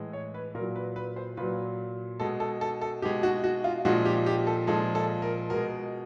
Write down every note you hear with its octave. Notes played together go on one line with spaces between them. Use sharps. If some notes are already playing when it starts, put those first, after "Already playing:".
Already playing: A2 E3 G#3
C#5
B4
A#2 F#3 A#4
B4
B4
C5
A#2 F#3 B4
B2 G#3 A4
A4
A4
A4
B2 G#3 G4
F#4
F#4
F4
A#2 F3 G#3 F#4
G4
G4
A4
A#2 F3 G#3 A4
A4
A#4
B2 G#3 A#4